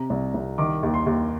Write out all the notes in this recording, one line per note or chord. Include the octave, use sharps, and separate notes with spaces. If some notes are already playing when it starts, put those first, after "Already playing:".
Already playing: C3 A#5
C2
C2
D#3 D6
D#2
C6
D#2